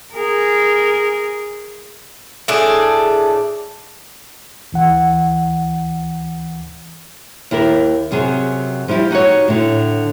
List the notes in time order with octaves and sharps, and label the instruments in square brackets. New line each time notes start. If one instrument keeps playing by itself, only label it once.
[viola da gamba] G#4 A#4
[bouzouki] A2 D4 G#4
[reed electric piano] D2 E3 F#5
[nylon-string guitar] D#2 E4 G4 A#4
F#2 C3 F#3 G#4
F3 G3 E4 F#4 G4
D#4 F#4 G4 C#5
A2 D3